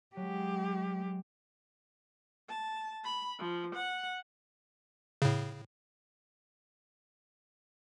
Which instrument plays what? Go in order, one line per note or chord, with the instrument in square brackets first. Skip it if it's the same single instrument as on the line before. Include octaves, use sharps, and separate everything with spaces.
[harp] F#3 [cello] G#3 G4
[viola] A5
B5
F3
F#5
[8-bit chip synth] A2 C#3